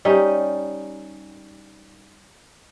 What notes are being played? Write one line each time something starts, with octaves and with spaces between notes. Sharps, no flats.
G3 C#4 D#4